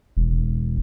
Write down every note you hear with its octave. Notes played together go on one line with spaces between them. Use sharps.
E1